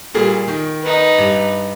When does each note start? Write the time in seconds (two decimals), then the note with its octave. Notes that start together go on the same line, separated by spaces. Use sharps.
0.14 A#2 G3 G#4
0.48 D#3
0.83 D#4 B4
1.18 G2